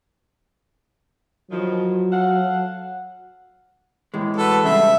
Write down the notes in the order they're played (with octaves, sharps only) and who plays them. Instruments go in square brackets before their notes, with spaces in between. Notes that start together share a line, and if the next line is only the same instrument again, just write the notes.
[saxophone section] G2 D#3 F3 [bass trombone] F#3
[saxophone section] A4 F5 F#5
[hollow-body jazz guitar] A2 E3 G#3
[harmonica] F#4 A4 B4
[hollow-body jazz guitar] G2 C#3 G#3 [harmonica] E5